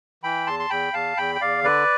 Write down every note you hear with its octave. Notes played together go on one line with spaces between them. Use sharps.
E3 G5 B5
E2 A5 C6
C6
E2 G5 B5
E2 F5 A5
E2 G5 B5
G5
E2 D5 F5
D3 B4 D5